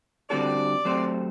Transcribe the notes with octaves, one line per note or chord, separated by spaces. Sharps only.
D3 G3 C4 F#4 A4 D5
F#3 A3 C4 G4 C5